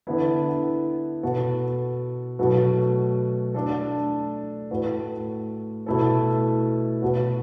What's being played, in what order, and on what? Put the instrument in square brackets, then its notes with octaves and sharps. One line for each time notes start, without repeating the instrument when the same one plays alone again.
[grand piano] D3 B3 E4 A4
B2 B3 F#4 A4
B2 F#3 A3 F#4 B4
A3 D4 A4
A2 A3 F#4 B4
B2 A3 E4 A4
B2 B3 F#4 A4